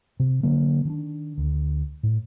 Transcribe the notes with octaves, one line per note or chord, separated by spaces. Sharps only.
C3
D3 F#3 A#3
D#3 C#4 D4
D2
A2